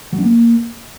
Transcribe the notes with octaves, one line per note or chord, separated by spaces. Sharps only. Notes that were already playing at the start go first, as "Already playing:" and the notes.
F#3
C#4
A#3